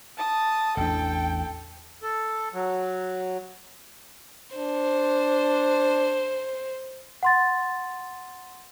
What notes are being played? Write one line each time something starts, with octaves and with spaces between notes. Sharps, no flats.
A5 D#6
A1 E2 D4 A4 G5
A4
F#3
D4 C5
F#5 C6 A6